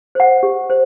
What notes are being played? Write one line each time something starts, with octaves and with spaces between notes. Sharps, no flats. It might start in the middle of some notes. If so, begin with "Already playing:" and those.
C5 F#5
G4
C5